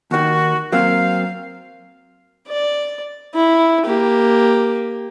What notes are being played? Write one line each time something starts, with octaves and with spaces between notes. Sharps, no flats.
D#2 D#3 F#4
F#3 A#3 C4 F5
D5
E4
A#3 G4